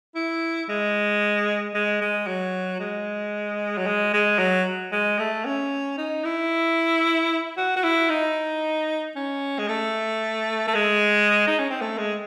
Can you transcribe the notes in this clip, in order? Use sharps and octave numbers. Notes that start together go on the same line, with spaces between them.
E4
G#3
G#3
G#3
F#3
G#3
F#3
G#3
G#3
F#3
G#3
A3
C#4
D#4
E4
F#4
F#4
E4
D#4
C#4
G#3
A3
A3
G#3
D#4
C#4
C4
A3
G#3